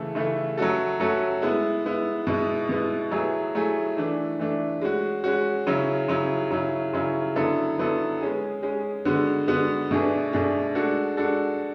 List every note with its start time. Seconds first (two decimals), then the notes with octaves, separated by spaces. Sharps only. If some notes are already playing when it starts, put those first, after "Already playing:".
Already playing: C#3 E3 A3 E4 A4
0.15 C#3 E3 A3 E4 A4
0.57 F#3 A3 C#4 F#4 A4
1.00 F#3 A3 C#4 F#4 A4
1.42 G#3 B3 E4
1.84 G#3 B3 E4
2.27 B2 G#3 B3 E4
2.69 B2 G#3 B3 E4
3.11 F#3 A3 E4 G#4
3.55 F#3 A3 E4 G#4
3.97 E3 A3 D4
4.39 E3 A3 D4
4.81 G#3 C#4 F#4
5.24 G#3 C#4 F#4
5.67 C#3 F#3 C#4 E4
6.08 C#3 F#3 C#4 E4
6.51 C#3 F#3 C#4 E4
6.93 C#3 F#3 C#4 E4
7.36 D3 F#3 B3 E4 A4
7.78 D3 F#3 B3 E4 A4
8.21 G#3 C#4 G#4
8.63 G#3 C#4 G#4
9.05 D3 G#3 B3 F#4
9.48 D3 G#3 B3 F#4
9.91 B2 A3 D4 G#4
10.33 B2 A3 D4 G#4
10.75 G#3 D4 F#4 A4
11.17 G#3 D4 F#4 A4